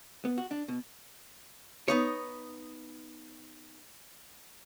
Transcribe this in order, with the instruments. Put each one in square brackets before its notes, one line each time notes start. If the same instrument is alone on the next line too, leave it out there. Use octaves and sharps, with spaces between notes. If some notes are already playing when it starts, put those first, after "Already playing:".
[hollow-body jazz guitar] B3
F#4
D4
B2
B3 D#4 C#5